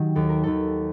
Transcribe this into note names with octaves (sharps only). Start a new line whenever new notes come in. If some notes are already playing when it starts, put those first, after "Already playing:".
Already playing: D#3 F#3 G4
D#2 A4
A#4
D#2 A4